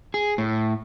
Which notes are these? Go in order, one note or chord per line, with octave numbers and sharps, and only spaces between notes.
G#4
A2